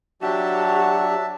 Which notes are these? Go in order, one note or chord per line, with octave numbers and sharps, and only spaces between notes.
F#3 D4 F#4 G4 E5 A5